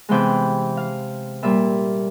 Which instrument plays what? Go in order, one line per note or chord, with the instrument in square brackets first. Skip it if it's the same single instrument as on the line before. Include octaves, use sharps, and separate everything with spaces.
[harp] C3 E3 G#3 B3 G5
F5
A#2 G3 A#3 E5